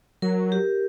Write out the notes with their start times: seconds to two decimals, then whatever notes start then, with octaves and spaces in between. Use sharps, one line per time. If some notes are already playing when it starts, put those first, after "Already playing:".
0.22 F#3 A#4
0.52 G4